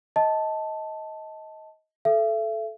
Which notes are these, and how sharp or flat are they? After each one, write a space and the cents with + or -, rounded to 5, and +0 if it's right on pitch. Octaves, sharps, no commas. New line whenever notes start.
D#5 +20 A5 +0
A4 -15 E5 +35